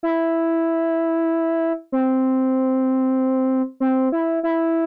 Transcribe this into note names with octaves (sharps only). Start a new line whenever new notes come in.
E4
C4
C4
E4
E4